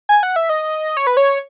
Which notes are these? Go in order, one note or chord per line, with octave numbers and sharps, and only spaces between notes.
G#5
F#5
E5
D#5
C#5
B4
C#5